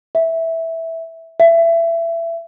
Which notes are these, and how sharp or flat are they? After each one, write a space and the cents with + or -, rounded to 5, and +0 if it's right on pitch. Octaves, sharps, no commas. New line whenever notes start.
E5 -10
E5 +25